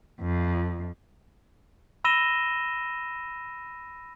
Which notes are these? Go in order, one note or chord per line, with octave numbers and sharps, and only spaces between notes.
F2
B5 E6 A#6 D#7 E7 G7